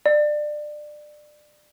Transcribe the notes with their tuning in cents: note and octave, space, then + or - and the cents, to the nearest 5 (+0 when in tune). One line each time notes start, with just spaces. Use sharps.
D5 +25